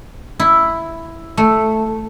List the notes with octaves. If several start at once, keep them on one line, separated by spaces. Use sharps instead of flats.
E4
A3